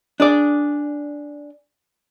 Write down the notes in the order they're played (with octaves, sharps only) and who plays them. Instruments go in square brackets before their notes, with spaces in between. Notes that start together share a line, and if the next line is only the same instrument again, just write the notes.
[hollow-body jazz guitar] D4 G#4 D5